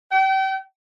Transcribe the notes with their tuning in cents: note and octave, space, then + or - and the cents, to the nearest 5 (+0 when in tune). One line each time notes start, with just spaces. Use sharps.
G5 -35